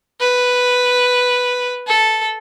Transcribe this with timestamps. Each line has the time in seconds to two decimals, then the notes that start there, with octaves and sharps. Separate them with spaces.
0.20 B4
1.87 A4